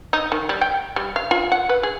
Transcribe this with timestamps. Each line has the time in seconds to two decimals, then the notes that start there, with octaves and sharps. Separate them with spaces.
0.13 D#4
0.32 D#3
0.49 G3
0.61 G5
0.96 G3
1.16 F5
1.31 F4
1.52 F#5
1.69 B4
1.83 G#4